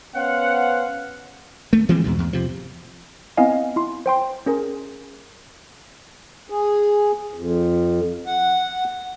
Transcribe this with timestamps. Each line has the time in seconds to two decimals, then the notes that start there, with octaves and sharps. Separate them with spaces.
0.16 B3 C#4 C5 F5 F#5
1.73 A3
1.89 E3 F#3 G#3 C4
2.04 E2 G#2 B2
2.19 E2
2.33 C3 F3
3.37 B3 C4 E4 D#5 F5 G#5
3.76 E4 C6
4.06 C5 G5 C6
4.46 C#4 G#4 A#4
6.50 G#4
7.34 F2
8.26 F#5